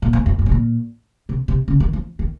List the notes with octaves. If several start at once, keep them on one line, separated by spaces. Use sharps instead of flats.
A#2
G#2
F2
F#2
C3
A#2
C3
C3
C#3
D#3
F3
D#3